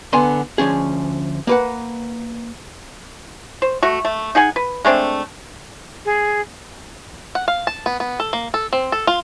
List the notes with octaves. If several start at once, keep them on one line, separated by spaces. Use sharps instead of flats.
D3 B3 G#5 A#5 C6
D2 F3 C#4 G#4
A#3 B4 F#5
C5
A3 F#4
A3
D#4 G#4 F#5 G#5
B4
G#3 A3 C4 D4
G#4
F#5
F5
A5
B3
B3
A4
A#3
A4
C4
A4
F4